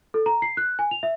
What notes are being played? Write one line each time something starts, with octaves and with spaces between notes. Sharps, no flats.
A4
A#5
C7
F#6
G#5
F7
E5